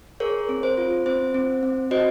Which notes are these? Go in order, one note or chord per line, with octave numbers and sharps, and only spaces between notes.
G#4 A#4 C#5
C4
C5
F4
C4 C5
C4
C4
F#4 C5 D#5